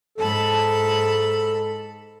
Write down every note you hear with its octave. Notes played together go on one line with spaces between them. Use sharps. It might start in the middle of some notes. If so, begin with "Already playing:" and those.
G#2 A4 A5 B5